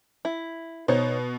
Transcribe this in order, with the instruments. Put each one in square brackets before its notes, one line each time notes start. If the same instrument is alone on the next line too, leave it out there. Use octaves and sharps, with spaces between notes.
[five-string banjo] E4
[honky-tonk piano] B2 [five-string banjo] D#4 C5 C#5